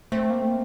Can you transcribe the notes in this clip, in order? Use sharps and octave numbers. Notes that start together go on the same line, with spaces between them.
A3 C4
A#3
A3
A#3